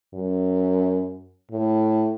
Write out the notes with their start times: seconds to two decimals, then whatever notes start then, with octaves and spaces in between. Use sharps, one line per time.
0.14 F#2
1.51 A2